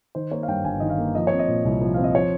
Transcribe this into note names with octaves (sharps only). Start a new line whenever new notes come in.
D#3 C5
A#3 C#5
F5
G2 G5
G1 G#5
D#3 D#5
F5
A#3
F3 D#5
C4 C#5
D#5
A#2
C2
F3
C4 F5
D#5
F3 C#5